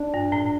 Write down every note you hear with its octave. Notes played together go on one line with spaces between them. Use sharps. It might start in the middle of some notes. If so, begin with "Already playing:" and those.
Already playing: D4
G2
A2